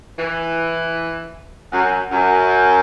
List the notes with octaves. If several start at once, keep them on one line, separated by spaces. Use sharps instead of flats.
E3
F#2
F#2